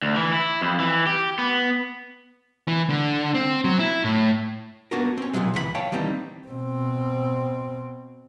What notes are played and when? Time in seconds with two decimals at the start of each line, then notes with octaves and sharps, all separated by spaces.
0.02 D2
0.16 E3
0.33 E4
0.61 F2
0.80 E3
1.06 G4
1.39 B3
2.68 E3
2.90 D3
3.35 C4
3.64 F#3
3.79 E4
4.04 A2
4.91 A#3 B3 D4 F#4 A#4
5.18 C4 C#4
5.33 B1 A#2 C#3 F3 F#3 G#3
5.54 C#2 E3 A#4 B5
5.75 C#5 F5 G5 A5
5.92 D#3 E3 G3 A#3 C4 D#4
6.48 B2 C4